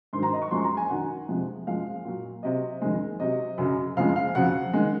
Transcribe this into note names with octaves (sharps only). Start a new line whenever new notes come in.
G#2 D#3 F#3 C6
A#5
D#5
C#6
F#2 F3 G#3 C6
A#5
G#5
F#2 D#3 F#3 F#5
F2 C3 F3 G#3
F#2 F3 G#3 F5
A#2 F#3
C3 F#3 D#5
F2 D#3 G#3
C3 F#3 D#5
F#2 C#3 F#3
F2 C#3 F3 G#3 F5
F5
F2 C#3 F#3 F#5
D#3 G#3